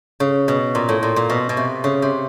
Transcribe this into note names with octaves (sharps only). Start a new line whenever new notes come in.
C#3
B2
A#2
A2
A#2
A#2
B2
B2
C3
C#3
C3